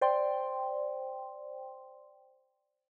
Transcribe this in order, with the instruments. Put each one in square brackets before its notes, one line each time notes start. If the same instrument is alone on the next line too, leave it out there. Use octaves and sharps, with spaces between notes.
[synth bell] C5 D5 G5 C6